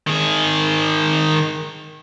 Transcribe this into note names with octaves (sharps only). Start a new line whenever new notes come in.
D#3 G#4